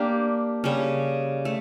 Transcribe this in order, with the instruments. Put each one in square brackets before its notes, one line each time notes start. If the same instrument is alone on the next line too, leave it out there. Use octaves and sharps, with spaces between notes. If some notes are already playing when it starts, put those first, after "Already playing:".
Already playing: [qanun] A#3 D4 G4
C#3 G3 C#4
A3